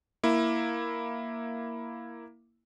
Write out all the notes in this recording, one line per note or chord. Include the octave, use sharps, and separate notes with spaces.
A#3 E4